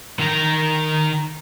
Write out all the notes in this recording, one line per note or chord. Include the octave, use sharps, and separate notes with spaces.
D#3 A#4